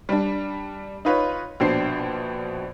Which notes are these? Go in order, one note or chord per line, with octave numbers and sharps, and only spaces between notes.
G3 D4
D#4 F4 B4 C#5
A#1 B2 D4 C5 C7